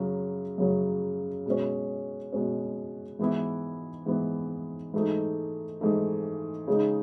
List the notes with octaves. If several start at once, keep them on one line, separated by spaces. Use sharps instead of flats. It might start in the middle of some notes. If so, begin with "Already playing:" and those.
Already playing: F#2 C#3 F#3
F#2 C#3 F#3
B2 G#3 C#4
B2 G#3 C#4
G#2 E3 B3 E4
G#2 E3 B3 E4
G#2 E3 A3 D#4
G#2 E3 A3 D#4
C#3 G#3 D#4